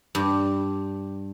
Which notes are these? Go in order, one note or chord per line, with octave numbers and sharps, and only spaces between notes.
G2